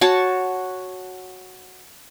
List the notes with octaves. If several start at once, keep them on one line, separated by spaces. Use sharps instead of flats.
F#4 C#5 A5 C#6